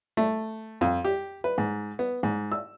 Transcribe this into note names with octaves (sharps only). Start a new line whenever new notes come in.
A3
F2
G4
B4
G#2
B3
G#2
E6